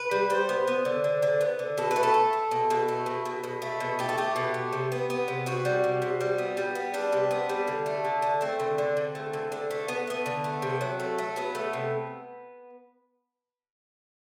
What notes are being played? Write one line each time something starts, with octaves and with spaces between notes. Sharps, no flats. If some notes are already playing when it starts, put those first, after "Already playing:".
Already playing: B4
G3
G3 C5
B3
B3
D3
D3
D3
B3
D3
B2 A4
B4
A3
A4
A3
A3
B2
B2
A3
B2
B2
B2
A3
B2
A3 G4
A4
A3 G4
B2
A3
C3
B3
B3
C3
C3 F#4
G3
C3
C3
G3
B3
G3
B3
G3 D4
C3
B3
G3
D3
A3
D3
D3
A3 C4
D3
D3
D3
A3
D3
D3
A3
A3 B3
A3 B3
D3
A3
C3
F#3
A3
A3
F#3 B3
A3
C3